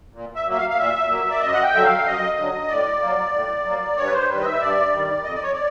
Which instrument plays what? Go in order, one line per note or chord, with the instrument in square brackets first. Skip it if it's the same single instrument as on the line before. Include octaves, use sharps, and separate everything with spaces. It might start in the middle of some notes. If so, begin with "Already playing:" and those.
[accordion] A#2
E5
F#3 A#3 E5
F5
F5
A#2 E5
F#3 A#3
D5
F#2 D#5
F#5
G5
D3 F#3 E5
F5
F#2 D#5
D3 F#3
A2 D5
F#3 A#3
A2
F#3 A#3
G2 C#5
B4
C5
D#3 G3 B4
D#5
E5
G2 D5
D#3 G3
F2 D#5
D5
C#5
D5